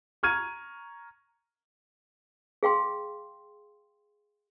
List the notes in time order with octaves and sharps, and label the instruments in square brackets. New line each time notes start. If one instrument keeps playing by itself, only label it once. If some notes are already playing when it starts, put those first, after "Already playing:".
[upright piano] A#5 C#6 F6 G#6 D#7
[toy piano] G#4 F5 G5 C6